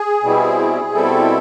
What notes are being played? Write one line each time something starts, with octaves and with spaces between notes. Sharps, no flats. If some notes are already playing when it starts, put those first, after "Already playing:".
Already playing: G#4
B2 G3 C4 E4
B2 G3 C4 E4 A4